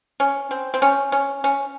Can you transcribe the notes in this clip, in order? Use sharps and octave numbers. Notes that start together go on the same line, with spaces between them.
C#4
C4
C4
C#4
C#4
C#4